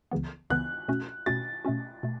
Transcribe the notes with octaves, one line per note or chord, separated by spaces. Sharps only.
C#2 C#3 E3 B3
C#2 C#3 E3 B3 F#6
B2 A3 C#4 F#4
B2 A3 C#4 F#4 A6
B2 A3 C#4 F#4
B2 A3